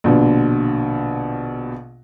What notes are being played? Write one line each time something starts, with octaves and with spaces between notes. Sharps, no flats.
A#1 B2 D3